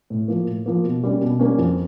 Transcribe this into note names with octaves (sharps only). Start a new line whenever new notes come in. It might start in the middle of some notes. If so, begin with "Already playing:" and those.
A2
F3 A#3
A2
F3 A#3
B2
G3 A#3 C#4
B2
G3 A#3 C#4
F2